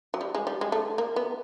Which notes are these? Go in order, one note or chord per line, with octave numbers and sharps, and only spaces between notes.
F#3
G3
G#3
G3
G#3
A3
A#3
B3